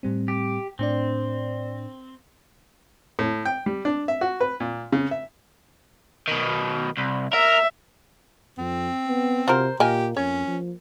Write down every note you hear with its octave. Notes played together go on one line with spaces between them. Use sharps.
A2 G3 C4
G4
A2 C4 D4 D5
A2
G5
G3
D4
E5
F#4
B4
A#2
C#3
E5
B2 D#3
C2
A#4 E5
F2 C4
B3
C3 F4 F#4 A#4 C5
A#2 A#3 G4 A#4 D#5 G#5
F2 C#4 C#5
F3